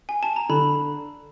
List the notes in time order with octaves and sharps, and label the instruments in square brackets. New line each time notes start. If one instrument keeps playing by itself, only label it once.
[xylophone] G#5
A5
A#5
[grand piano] D3 [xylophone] B5